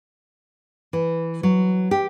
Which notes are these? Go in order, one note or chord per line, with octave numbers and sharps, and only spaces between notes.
E3
F#3
G4